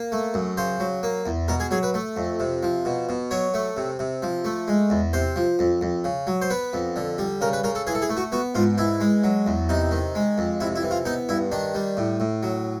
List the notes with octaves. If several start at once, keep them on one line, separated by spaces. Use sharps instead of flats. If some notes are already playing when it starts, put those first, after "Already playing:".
Already playing: A#3
A3
F#2
C#3 C5
F#3
A#3
E2
B2 A#4
G#4
F#3 G#4
B4
A3
F2
C3
F3
B2
B2
F#3 C#5
A3
C3
C3
F3
A3
G#3
E2
C3 C5
F3
F2
F2
C#3
F#3
C5
B3 B4
F2
D3
G3
C#3 A#4
B4
C#3 A#4
A4
E3 G#4
A4
G#4
A3
F#4
B3 F#4
G#2 F4
E3 E4
G#3
F#3
E2
C3 D#4
D#3
G#3
F2
C3 E4
E4
E3
F4
B3 D#4
G2 E4
D#3 D4
G3
A2
A2
F#3